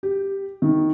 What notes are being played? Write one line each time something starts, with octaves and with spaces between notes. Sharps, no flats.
G4
D#3